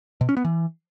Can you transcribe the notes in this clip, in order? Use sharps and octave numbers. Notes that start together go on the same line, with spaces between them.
B2
C#4
B3
E3